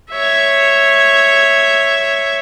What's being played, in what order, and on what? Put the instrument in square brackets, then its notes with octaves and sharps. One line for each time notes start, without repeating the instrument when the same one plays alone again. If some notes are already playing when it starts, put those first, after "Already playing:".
[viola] C#5 E5